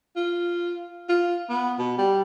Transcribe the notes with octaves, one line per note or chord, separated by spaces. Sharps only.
F4
F4
B3
B2
G3